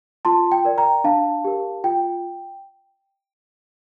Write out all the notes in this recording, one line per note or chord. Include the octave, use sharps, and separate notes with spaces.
F4 A5 C6
G5
A#4 D5
G5 A#5
D4 F5 A5
G4 A#4
F4 G5